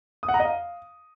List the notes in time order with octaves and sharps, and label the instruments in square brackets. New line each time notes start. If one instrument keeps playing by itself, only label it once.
[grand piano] D#6
F#5
A#5
D#5
F5